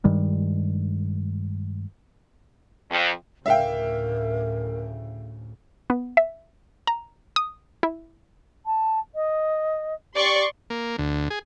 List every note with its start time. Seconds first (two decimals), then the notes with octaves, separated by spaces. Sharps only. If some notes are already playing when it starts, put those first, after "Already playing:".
0.04 G2 D#3 G3 G#3
2.91 F2
3.46 D2 A2 C#3 A#4 E5 F5 G5
5.90 B3
6.17 E5
6.87 A#5
7.36 D#6
7.83 E4
8.66 A5
9.15 D#5
10.15 G4 D5 C6 C#6
10.70 A#3
10.98 D2
11.30 G#4